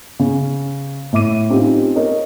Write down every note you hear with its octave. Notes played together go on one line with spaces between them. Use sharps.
C#3
A2 E5 D6 D#7
C4 C#4 D#4 F4 G4
A#4 C#5 D#5